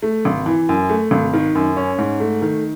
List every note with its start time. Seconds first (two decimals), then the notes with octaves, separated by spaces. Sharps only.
0.02 A3
0.25 G#1
0.46 E3
0.69 F#2
0.90 A3
1.11 G#1
1.34 D#3
1.55 F#2
1.76 C#4
1.98 G#2
2.20 A3
2.42 D#3